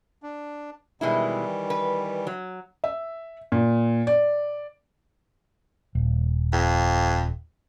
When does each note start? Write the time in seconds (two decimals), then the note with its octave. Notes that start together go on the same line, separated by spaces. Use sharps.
0.23 D4
1.01 B2 D#3 E3 G3 G#3 E4
1.70 B4
2.27 F#3
2.84 E5
3.52 A#2
4.07 D5
5.95 D#1
6.53 F2